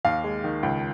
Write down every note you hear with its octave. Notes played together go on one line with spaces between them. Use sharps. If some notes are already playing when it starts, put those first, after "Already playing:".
D#2 F5
G#3
D#3
C#2